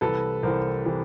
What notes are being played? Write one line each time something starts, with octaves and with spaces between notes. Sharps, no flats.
C2 C3 E3 A4 B4
C2 C3 E3 A#4 C5
C3 E3